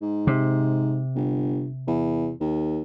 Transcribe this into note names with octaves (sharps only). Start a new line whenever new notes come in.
G#2
C3
G1
E2
D#2